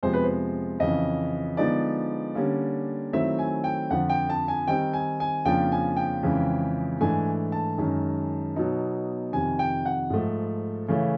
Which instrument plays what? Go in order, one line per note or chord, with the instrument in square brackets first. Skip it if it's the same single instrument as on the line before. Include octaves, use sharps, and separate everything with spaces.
[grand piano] F2 C3 F3 G#3 B3 C5
B4
C5
F2 C#3 E3 D#5
D3 F3 G#3 B3 D#4 D5
D3 G3 A#3 C#4
D#3 F#3 A3 C4 E4 E5
G#5
G5
F2 D3 F3 F#5
G5
A5
G#5
D#3 G3 C4 D#4 G5
G#5
G#5
F2 C#3 F3 A#3 D4 G5
G#5
G5
F2 C#3 E3 G#3
G#2 E3 A3 D4 G#5
A5
F#2 D#3 G#3
B2 F#3 B3 D#4
F2 C3 D#3 G#5
G5
F#5
G#2 F3 A3
C#3 E3 A3 C#4